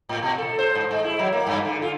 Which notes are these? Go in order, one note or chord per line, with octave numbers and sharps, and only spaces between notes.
A2
B2
A4
C5
G#2
G#3
E4
F#3
A#3
G2
D3
F4